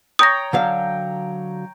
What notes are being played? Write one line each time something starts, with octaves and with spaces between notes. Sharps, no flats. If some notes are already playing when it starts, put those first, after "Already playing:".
C#5 G5 A#5 D#6 A#6
D3 F#3 F5